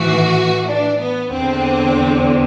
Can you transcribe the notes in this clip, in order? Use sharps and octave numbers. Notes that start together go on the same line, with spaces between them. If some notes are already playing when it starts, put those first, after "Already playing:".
Already playing: A2 E3 F#4
D4
B3
E2 D3 C4